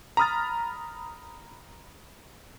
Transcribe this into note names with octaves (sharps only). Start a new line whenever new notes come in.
A#5 B5 D#6 F6 A6